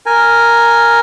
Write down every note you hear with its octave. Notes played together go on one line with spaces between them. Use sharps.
A#4 G#5